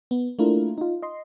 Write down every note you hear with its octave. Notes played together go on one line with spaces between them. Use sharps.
B3
A3 A#3 D4 E4 F4 A#4
D#4 F4
D#5 C6